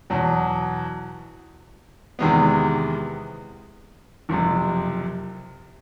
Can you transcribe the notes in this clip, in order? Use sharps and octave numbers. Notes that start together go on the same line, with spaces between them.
E2 B2 F#3
E2 C3 D#3 G#3 B3
F#1 F2 C3